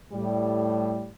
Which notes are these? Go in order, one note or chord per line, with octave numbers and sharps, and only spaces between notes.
A2 G3